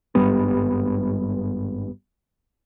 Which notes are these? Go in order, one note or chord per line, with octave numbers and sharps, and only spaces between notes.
G#1 G2 G3 B3